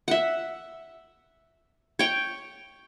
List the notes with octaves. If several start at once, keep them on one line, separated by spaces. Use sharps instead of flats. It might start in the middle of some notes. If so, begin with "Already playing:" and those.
E5 F#5
C#5 G5